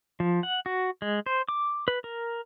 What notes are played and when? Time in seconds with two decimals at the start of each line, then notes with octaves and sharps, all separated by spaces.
0.20 F3
0.43 F#5
0.66 F#4
1.02 G#3
1.26 C5
1.49 D6
1.88 B4
2.04 A#4